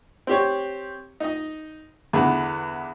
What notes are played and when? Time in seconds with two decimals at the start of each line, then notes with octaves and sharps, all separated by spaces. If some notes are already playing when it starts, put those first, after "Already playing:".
0.27 C4 G4 C#5
1.20 D#4 D#5
2.13 E2 D3 B3 B4